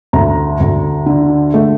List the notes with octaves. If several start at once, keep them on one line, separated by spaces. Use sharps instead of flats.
D2 A#5
D2
D3
A3